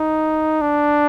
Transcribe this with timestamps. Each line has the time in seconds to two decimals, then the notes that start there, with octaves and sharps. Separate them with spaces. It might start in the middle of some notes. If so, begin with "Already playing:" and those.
Already playing: D#4
0.61 D4